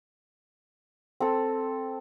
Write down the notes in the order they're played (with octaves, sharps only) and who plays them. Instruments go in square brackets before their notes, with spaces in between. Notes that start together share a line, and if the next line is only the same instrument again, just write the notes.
[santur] C4 A4